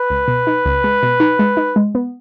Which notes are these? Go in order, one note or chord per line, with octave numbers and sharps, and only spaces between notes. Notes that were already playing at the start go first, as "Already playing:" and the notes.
Already playing: B4
C#2
B2
D#4
C#2
G#3
B2
D#4
G#3
D#4
G#3
B3